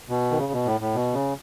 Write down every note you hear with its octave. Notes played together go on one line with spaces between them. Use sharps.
B2
D#3
C#3
B2
A2
A2
B2
C#3